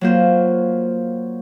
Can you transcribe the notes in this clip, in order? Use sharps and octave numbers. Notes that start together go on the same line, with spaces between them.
F#3 A#3 F4 C5